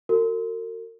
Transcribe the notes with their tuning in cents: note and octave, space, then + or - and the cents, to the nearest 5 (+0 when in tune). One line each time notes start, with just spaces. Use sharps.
F#4 +0 A#4 -45